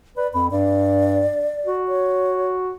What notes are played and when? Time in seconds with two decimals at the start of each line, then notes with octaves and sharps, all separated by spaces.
0.17 B4 D5
0.34 F2 B5
0.51 G2 D5
1.66 F#4
1.88 C#5